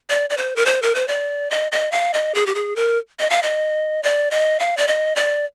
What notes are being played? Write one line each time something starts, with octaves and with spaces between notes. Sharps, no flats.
D5
D5
C5
A#4
C5
A#4
C5
D5
D#5
D#5
F5
D#5
G#4
G4
G#4
A#4
D#5
F5
D#5
D5
D#5
F5
D5
D#5
D5